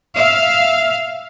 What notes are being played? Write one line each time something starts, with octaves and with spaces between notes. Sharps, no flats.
E5 F5